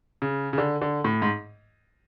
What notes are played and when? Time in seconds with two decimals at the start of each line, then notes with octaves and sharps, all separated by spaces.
0.22 C#3
0.53 C#3
0.58 D3
0.82 D3
1.04 A2
1.22 G#2